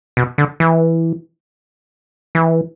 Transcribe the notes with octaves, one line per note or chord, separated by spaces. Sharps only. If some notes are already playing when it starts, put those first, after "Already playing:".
B2
D3
E3
E3